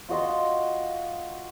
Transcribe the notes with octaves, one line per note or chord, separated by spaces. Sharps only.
F4 F#4 D#5 C6